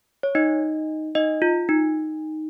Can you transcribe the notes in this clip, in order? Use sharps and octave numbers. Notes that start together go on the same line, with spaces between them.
C#5
D#4 D#5
D#4 D#5
F4
D#4